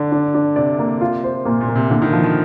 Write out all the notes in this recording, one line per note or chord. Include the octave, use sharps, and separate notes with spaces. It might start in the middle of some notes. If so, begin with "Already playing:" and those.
Already playing: D3 D4 D5
D4
D4
C3 D5
A#3
F4
C5
A#2 A#3
A#2
A#3
C3
D3 A#3
D#3
F3 F4
F3